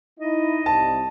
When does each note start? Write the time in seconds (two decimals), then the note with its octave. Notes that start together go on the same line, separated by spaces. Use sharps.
0.20 D#4 E4 D#5
0.66 C2 A5